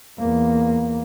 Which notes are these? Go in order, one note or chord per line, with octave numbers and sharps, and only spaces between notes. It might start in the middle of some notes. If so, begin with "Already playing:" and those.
E2 A#3